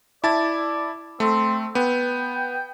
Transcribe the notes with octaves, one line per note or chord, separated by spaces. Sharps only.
E4 D5 A5 A6
A3 C4
B3 G5